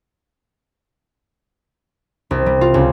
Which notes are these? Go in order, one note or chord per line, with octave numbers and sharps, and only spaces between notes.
C2
G3
F4
C#2